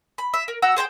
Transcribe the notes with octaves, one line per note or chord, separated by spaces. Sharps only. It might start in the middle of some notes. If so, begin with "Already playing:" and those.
B5
E5
A#4
F#4 F#5 A#5 E6
G#4 C5 F#5 G5